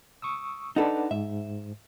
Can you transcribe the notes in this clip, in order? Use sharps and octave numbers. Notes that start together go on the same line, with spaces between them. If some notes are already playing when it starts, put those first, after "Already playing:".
C#6 D#6 E6
D4 D#4 A4 B4 F#5
G#2 E5